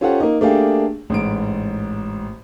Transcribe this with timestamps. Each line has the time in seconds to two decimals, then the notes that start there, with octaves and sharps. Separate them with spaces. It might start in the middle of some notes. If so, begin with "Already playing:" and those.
0.01 C#4 F4 G4 A4 C5 F#5
0.20 A#3 D#4
0.41 A3 A#3 D4 G4 G#4 F5
1.10 A1 G#2 D7